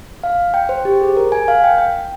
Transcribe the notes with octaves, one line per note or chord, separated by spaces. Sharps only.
F5
G5
C5
G4
G#4
A#4
G#5
F5
G5
G5